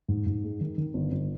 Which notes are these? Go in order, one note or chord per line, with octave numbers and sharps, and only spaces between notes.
G#2
G#2
G#3
D#3
D#3
G1
G1